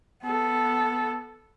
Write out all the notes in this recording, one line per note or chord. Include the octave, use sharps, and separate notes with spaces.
B3 A4